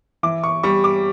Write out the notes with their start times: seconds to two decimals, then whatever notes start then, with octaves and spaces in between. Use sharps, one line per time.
0.23 E3 D6
0.44 C#6
0.63 G3 C#6
0.84 D6